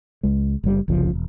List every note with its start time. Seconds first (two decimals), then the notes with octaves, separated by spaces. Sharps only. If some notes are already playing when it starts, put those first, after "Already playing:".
0.23 C#2 G#3
0.64 F#1 G3
0.88 F#1 C2 C#3 F3
1.13 E1